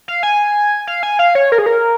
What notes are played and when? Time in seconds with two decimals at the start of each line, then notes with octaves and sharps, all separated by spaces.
0.08 F5
0.23 G#5
0.87 F5
1.03 G#5
1.19 F5
1.35 C#5
1.52 A#4
1.58 G#4
1.66 A#4